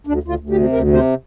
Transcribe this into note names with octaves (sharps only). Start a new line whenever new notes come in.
D2 D4
D2 F4
D2
G4
C3
D2 A#4
C3
C5